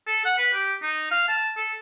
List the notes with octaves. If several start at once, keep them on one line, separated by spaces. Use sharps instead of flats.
A4
F#5
B4
G4
D#4
F5
A5
A4